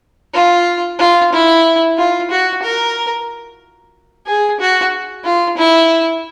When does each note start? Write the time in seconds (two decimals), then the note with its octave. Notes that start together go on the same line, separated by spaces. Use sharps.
0.34 F4
0.99 F4
1.32 E4
1.97 F4
2.30 F#4
2.63 A#4
4.26 G#4
4.60 F#4
5.24 F4
5.57 E4